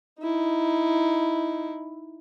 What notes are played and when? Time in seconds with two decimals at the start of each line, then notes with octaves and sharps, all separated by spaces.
0.20 D#4 E4